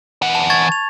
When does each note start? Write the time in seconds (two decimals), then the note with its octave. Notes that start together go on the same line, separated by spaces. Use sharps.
0.22 E3 F#5
0.35 A5
0.50 C#6 G#6 A6
0.72 F7